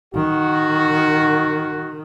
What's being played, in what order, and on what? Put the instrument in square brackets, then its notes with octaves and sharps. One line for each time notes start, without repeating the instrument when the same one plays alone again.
[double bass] D#3 [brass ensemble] F#4